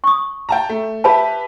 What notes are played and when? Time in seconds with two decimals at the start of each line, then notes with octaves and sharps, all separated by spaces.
0.04 C#6 D#6
0.49 G5 A5 A#5
0.69 A3
1.04 G4 B4 E5 A5 B5